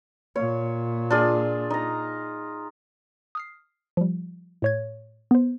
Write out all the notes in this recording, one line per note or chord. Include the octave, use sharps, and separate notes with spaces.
A#2 C#5
D4 F4 G#4
D#4 A#5
D#6 F6 C7
F3 G3
A2 C#5 G#6
B3 C5